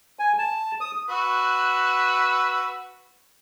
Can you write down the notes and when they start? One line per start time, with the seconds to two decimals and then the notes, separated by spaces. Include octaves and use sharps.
0.19 G#5
0.39 A5
0.81 D#6
1.09 F#4 B4 E6